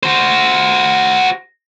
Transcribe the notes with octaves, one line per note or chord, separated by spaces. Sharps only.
F#4 C5